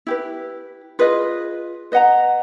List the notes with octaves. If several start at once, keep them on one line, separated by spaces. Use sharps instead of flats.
E4 G4 B4
F4 G#4 B4 D#5
B4 D#5 F#5 A#5